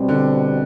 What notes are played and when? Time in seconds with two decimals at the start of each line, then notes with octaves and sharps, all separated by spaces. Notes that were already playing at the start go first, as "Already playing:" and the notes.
Already playing: B2 G3 C4
0.09 D3